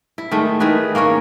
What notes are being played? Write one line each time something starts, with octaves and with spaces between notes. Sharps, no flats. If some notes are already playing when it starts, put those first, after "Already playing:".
E4
D#3 G#3 A3
D#3 E3 G#4 B4
A#3 C#4 A#4 C#5